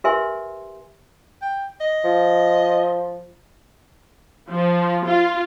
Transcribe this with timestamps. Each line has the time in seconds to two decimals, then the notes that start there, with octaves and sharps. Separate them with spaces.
0.04 G4 A#4 B4 E5 G#5 C6
1.42 G5
1.81 D#5
2.05 F3
4.49 F3
5.06 F4